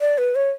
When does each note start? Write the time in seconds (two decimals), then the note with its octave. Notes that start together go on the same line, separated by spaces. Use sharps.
0.01 D5
0.18 B4
0.35 C#5